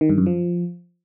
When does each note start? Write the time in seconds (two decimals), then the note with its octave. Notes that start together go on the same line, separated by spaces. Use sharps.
0.01 D#3
0.10 G2
0.18 F#2
0.26 F3